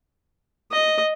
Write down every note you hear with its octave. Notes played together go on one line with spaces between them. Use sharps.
D#5